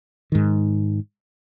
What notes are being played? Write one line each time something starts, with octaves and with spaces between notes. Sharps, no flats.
G#2 D#3